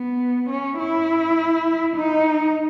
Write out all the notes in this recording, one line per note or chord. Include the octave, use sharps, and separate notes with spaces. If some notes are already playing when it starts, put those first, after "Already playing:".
Already playing: B3
C#4
E4
D#4